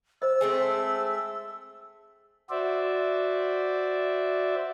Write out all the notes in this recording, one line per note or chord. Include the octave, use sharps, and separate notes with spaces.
C5 D#5 E6
G#3 A3 C4
F#4 C5 D5 E5